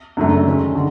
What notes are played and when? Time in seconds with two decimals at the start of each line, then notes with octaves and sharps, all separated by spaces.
0.17 F#2 C#3 F#3 A3 D4
0.46 D#3 G#3 C#4
0.75 D3